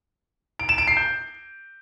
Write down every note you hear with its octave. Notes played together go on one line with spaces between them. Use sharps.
D7
E7
D7
C7
G6